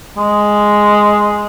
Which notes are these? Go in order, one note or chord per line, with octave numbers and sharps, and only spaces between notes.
G#3